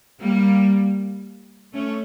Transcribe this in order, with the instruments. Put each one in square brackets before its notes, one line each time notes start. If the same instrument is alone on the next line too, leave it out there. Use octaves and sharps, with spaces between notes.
[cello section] G3 A#3
A3 C#4